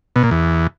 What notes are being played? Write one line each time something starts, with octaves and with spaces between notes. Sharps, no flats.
B2
A#2
E2